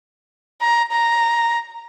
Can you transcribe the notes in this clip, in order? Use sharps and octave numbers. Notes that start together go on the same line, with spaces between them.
A#5
A#5